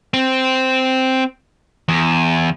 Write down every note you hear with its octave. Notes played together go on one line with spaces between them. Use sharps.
C4
E2